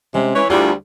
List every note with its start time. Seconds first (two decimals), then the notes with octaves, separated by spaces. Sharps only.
0.14 C3 G#3 C#4
0.35 E3 C#5
0.50 D2 G3 E4 F4 G#4